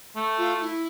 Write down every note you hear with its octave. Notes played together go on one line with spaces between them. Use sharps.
A3
F4
E4